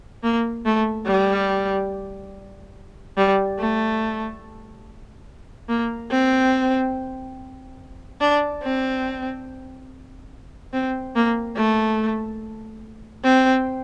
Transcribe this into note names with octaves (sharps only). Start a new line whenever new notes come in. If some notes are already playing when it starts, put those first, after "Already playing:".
A#3
A3
G3
G3
A3
A#3
C4
D4
C4
C4
A#3
A3
C4